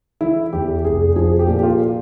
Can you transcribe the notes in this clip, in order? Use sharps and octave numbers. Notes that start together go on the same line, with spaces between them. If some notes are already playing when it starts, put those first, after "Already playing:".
E3 E4
E2 G4
F1 G#4
F3 G#4
G4
A#2
G4
F4